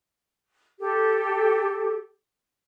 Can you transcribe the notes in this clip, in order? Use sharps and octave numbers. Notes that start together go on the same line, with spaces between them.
G4 A4